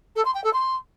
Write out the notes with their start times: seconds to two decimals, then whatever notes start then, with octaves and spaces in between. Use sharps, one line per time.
0.16 A4
0.25 C6
0.34 G5
0.44 A4
0.53 C6